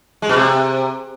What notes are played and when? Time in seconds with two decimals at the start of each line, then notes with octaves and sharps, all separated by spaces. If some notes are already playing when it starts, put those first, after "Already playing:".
0.22 G#3
0.29 B2
0.36 C3